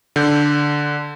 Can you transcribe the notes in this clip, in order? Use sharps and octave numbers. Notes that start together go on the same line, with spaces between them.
D3 G6